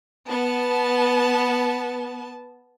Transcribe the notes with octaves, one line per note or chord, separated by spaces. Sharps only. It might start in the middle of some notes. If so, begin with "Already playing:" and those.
B3 A5